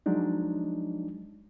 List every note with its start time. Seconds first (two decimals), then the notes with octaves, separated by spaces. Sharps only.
0.06 F3 F#3 G#3 D4 D#4